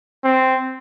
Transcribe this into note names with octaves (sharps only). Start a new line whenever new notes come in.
C4